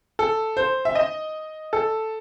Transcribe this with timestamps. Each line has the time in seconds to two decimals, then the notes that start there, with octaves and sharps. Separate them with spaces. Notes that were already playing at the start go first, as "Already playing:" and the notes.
0.19 A4
0.57 C5
0.85 E5
0.95 D#5
1.73 A4